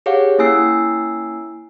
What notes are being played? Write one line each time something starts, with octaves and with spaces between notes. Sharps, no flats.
G4 G#4 C#5 F5 F#5
A#3 C#4 E4 G#5 E6 C7